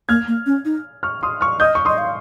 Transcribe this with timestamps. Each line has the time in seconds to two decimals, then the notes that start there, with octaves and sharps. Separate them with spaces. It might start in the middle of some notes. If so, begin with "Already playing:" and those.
0.09 A#3 F6 G#6
0.28 A#3
0.46 C#4
0.65 D#4
1.03 C#6 F6
1.23 C6 D#6
1.41 C#6 F6
1.60 D#5 D#6 G6
1.75 C#6
1.85 D#5 C6 D#6
1.98 F5